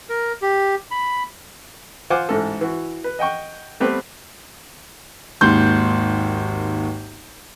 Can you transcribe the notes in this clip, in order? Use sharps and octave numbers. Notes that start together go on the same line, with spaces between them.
A#4
G4
B5
F4 C5 F#5 G#5 D6
A1 G#2 A4
E3 F#4
B4
D#5 F#5 G5 C#6
G3 A3 B3 C4 G4 B4
G#1 D#2 C6 G6